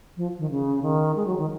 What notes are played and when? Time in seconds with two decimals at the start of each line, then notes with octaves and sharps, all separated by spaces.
0.17 F3
0.39 D#3
0.50 C#3
0.82 D#3
1.16 G#3
1.26 F#3
1.38 D#3